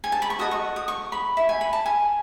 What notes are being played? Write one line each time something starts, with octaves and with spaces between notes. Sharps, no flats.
G#5
A5
B5
C#6
F#4 A4 D#5 D#6
C#6
D#6
C#6
B5
E5
G#5
B5
A5
G#5